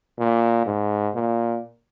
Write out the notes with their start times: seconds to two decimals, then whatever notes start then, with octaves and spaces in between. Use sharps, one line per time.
0.19 A#2
0.66 G#2
1.15 A#2